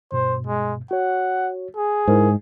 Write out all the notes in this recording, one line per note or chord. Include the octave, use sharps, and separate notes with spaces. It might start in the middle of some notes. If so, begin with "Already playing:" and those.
G2 B2 C5
G#3
F#4 C#5 F#5
G#4
G#2 E4 A#4 C5